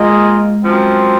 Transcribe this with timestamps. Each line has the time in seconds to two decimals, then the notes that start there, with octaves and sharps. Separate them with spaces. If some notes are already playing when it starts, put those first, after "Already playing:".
Already playing: G#3 A#3 F4 G#4 D#5
0.63 F#2 F3 C4